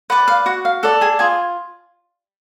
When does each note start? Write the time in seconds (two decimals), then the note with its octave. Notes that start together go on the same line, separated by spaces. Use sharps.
0.10 B4 D5 F#5
0.28 F5
0.46 F#4 F#5
0.65 F5
0.83 A4 D5 F#5
1.01 G#4 G#5
1.19 F4 G#4 G#5